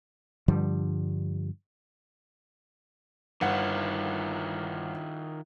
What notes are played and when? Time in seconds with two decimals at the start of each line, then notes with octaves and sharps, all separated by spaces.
0.48 G2 D3 F3 G3
3.41 G1 D#3 E4 F4 F#5